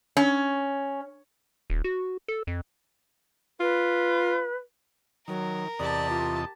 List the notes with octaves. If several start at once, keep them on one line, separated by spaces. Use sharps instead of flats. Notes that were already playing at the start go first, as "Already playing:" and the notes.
C#4
D#1
F#4
A4
F2
F4 B4
D#3 F#3 A#4
E2 C3 G4 D5 D#5 A5
F4